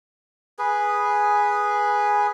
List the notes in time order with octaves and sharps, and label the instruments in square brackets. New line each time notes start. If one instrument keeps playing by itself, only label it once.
[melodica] G#4 B4